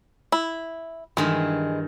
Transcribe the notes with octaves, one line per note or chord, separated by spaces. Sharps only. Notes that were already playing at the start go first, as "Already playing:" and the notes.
E4
G2 D#3 E3 G#3